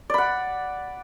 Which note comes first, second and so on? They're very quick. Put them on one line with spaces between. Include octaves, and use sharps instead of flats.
D5 B5 F#5